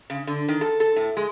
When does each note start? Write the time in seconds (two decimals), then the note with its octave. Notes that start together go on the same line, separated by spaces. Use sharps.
0.10 C#3
0.27 D3
0.49 D#3
0.61 A4
0.80 A4
0.96 A2
1.17 G#3